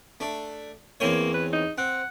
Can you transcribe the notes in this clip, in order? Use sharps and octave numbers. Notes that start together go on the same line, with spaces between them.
A3 D4
E2 A#3 C4 C#5
B4
D#4
C4 F#5